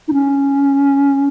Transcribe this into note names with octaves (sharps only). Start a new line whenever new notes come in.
D#4
C#4